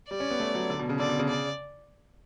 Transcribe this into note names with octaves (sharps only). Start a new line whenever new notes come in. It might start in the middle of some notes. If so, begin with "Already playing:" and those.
G3 D5
C#4
B3
A3
F#3
D3
B2
C#3
D3 D5
B2
C#3
D5